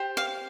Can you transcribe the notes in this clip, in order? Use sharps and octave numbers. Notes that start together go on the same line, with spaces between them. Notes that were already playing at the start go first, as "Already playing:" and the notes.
Already playing: G4 C5
F5